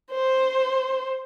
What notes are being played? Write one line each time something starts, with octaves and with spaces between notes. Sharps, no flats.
C5